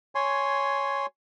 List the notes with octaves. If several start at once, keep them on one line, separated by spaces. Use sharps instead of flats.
C#5 G#5 C6